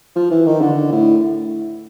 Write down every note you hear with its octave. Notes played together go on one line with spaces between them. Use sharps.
F3
E3
D#3
D3
A2